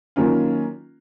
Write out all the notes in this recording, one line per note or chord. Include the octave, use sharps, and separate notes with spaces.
D#3 F#3 A#3 C#4 F4